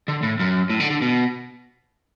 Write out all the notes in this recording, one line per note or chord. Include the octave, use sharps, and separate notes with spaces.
D3
A2
F#2
A2
D3
D3
B2